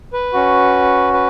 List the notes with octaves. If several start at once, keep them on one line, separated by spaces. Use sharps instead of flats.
B4
C#4 F#4
B4